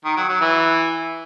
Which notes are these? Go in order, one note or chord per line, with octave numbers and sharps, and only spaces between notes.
D#3
F#3
F#3
E3